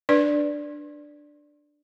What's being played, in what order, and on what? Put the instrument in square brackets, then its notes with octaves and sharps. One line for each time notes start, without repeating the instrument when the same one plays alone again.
[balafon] D4 B4 D5